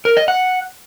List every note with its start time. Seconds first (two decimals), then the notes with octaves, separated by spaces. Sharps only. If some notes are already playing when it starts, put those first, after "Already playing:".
0.05 A#4
0.17 D#5
0.28 F#5